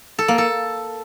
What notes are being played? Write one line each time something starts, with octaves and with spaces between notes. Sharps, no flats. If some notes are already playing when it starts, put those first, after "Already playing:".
A4
A#3
A4